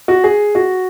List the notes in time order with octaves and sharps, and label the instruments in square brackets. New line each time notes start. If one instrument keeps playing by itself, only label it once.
[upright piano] F#4
G#4
F#4